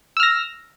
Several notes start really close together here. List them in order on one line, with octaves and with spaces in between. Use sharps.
E6 F6 A#6